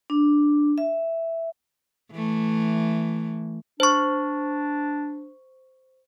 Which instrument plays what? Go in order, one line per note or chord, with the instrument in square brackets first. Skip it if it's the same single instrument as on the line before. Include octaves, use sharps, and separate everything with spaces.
[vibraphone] D4
E5
[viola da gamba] E3 A3
[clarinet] D4 [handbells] C5 C#6